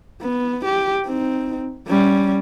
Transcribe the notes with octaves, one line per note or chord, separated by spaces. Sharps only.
B3
G4
C4 D#4
G3 C#4